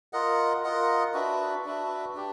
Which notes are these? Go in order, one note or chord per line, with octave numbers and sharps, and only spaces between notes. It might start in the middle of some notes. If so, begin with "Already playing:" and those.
F4 A#4 D#5 F#5
F4 A#4 D#5 F#5
D4 F#4 B4 E5
D4 F#4 B4 E5
D4 G4